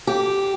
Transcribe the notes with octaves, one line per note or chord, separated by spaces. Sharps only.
G4